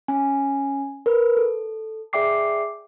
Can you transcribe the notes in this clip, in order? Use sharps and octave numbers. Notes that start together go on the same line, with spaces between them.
C#4 G#5
A#4 B4
A4
G#4 D5 E5 G5 D6 C7